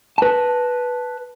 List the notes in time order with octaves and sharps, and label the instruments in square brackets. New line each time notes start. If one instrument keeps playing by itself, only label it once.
[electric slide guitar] B4 A5